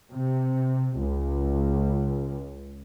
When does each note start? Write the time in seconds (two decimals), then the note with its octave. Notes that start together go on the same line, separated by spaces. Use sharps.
0.13 C3
0.97 C#2